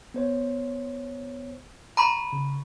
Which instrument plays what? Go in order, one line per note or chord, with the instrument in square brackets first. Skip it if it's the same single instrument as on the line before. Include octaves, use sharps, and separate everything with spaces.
[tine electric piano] B3 C5 C#5
[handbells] A#5 B5 C#6
[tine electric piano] C#3